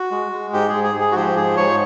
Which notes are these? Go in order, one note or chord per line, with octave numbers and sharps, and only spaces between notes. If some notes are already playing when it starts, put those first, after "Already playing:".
Already playing: F#4
G#3
G#3
G#2 G4
G#4
G#2
G#4
G#2
G#4
F#4
F3 G4
G#2 G#4
G#2 C#5